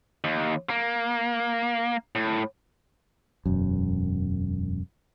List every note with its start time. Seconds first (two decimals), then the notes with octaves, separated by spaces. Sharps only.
0.24 D#2
0.69 A#3
2.15 A2
3.46 E1 F#2